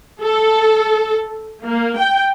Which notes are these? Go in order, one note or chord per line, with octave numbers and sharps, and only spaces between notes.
A4
A#3
G5